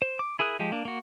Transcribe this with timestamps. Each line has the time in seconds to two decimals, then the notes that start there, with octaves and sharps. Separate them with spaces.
0.02 C5
0.19 D6
0.39 E4 G#4 A#4 D#6 F#6
0.59 F3 G#3 G4
0.72 A#3 D4
0.85 A#3 F#4